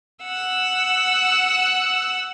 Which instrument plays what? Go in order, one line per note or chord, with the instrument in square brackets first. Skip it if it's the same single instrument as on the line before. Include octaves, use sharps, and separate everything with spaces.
[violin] F#5 E6